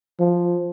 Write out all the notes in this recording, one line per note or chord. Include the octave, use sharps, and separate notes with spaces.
F3